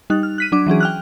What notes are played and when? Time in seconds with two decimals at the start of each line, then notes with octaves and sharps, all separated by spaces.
0.10 G3 D#4 F#6
0.23 F6
0.38 F#6 B6 D#7
0.52 F#3 D4 D6
0.66 E3 F#3 C#4 G#4
0.80 G5 F6 F#6